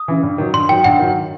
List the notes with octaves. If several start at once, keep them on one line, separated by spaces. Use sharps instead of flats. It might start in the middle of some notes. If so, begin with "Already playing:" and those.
Already playing: D#6
C#3 E3
G2
D#3 F#3
G2 C6
D#3 F#3 G5
G2 F#5
D#3 F#3